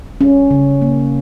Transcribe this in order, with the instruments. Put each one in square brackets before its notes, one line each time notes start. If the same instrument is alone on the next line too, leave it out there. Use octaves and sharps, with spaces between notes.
[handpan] G3 C#4
C#3
A#3